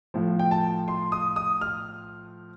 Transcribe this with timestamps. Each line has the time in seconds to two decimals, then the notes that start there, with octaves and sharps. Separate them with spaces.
0.14 A2 F3
0.39 G5
0.51 A5
0.88 C6
1.12 D#6
1.36 D#6
1.61 F6